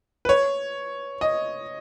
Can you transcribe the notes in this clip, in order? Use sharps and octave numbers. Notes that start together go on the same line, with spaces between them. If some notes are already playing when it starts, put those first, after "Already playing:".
B4
C#5
D#5